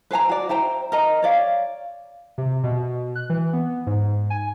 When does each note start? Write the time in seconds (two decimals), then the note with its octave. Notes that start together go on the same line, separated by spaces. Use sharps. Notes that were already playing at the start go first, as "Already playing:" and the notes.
0.11 B4 C5 G#5 A#5
0.29 F#4 D5
0.49 E4 C5 G5 A#5
0.92 A#4 D#5 A#5
1.23 C#5 D5 F5
2.38 C3
2.64 B2
3.15 F#6
3.30 E3
3.53 B3
3.87 G#2
4.30 G#5